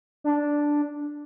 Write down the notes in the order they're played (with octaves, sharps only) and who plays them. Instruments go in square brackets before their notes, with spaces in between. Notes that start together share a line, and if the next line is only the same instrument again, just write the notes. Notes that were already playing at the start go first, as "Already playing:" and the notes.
[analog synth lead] D4